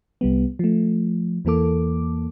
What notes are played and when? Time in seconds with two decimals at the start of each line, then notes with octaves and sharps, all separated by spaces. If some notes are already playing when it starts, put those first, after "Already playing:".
0.21 C2 G3 B3
0.59 F3 A3
1.45 E2 E3 A#3 A4 D6